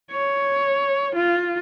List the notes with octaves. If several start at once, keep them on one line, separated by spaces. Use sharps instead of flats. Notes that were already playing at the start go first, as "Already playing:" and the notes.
C#5
F4